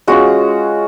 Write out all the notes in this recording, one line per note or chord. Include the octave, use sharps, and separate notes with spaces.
G#3 C#4 F4 F#4